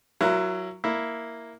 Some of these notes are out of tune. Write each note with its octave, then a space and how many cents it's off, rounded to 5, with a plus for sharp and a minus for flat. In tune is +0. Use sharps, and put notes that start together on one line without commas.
F#3 +0 E4 +30 A#4 +10
A#3 +0 E4 +0